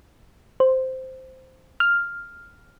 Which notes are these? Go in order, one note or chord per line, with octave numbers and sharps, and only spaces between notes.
C5
F6